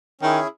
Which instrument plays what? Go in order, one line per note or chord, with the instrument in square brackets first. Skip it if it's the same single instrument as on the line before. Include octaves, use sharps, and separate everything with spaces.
[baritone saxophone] D#3 [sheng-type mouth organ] C#4 E4 G#4